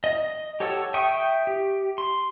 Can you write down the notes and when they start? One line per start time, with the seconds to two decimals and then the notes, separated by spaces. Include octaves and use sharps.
0.04 D#5
0.60 G4 A4 C#5 F#5 E6
0.94 E5 G5 C#6 D#6
1.47 G4
1.98 C6